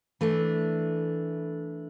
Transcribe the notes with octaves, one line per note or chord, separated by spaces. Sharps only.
E3 A3 D4